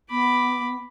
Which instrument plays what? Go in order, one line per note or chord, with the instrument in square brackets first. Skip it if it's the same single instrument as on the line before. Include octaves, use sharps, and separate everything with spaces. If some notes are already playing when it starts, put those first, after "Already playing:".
[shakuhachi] B3 [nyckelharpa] B5 D6